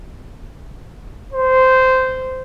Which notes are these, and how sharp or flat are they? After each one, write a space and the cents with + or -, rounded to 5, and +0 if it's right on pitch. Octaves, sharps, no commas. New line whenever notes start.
C5 -15